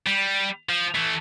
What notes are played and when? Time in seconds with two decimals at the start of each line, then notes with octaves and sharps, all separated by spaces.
0.07 G3
0.69 F3
0.95 E3 A3